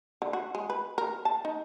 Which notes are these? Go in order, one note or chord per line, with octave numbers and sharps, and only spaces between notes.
D3
F#4
G#3
B4
A#4
A5
D#4